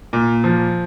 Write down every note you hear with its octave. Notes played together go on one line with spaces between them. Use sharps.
A#2
F3